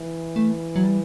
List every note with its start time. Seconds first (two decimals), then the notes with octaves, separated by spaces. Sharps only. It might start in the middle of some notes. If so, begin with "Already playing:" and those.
Already playing: E3
0.36 A3
0.76 F#3
0.83 G3